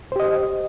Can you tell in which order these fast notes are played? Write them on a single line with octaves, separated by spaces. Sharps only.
C5 G4 D#5